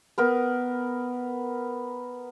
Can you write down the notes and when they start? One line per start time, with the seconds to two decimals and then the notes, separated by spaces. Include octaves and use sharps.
0.18 B3 A#4 B4